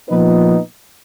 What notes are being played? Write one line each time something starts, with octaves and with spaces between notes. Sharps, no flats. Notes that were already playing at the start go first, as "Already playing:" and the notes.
A#2 F3 B3 D#4 B4